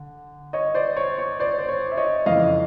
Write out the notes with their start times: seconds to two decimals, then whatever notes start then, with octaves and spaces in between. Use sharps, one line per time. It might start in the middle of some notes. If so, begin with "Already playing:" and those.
Already playing: D3
0.53 C#5 D#5
0.75 C5 D5
0.97 C#5
1.18 C#5
1.40 C5 D5
1.58 C5
1.69 C#5
1.92 E5
1.97 C#5 D#5
2.26 F2 C#3 E3 D#5 F5